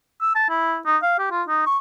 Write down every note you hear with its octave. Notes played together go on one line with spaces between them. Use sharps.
E6
A5
E4
D#4
F5
G4
F4
D#4
C#6